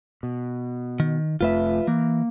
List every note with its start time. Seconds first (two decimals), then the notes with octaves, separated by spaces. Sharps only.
0.23 B2
1.00 D#3
1.41 F1 F2 A3 F4 B4 E5
1.87 E3 A#3